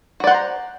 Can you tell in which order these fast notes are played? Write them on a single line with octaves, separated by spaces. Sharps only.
F#4 D5 F#5 C5 A#5